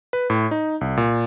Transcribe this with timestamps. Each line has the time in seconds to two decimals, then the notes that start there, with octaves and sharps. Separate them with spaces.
0.13 B4
0.30 A2
0.51 D#4
0.81 C2
0.97 A#2